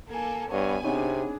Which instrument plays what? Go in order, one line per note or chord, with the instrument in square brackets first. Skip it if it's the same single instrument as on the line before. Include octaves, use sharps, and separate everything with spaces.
[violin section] A#3 A4 [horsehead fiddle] G#5
[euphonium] G2 [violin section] B3 G#5 [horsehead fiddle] C#5
[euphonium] C3 [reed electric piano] C4 D#4 C#5 [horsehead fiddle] D4 G#4